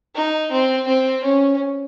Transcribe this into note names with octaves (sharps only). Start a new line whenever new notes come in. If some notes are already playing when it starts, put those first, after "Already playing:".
D#4
C4
C4
C#4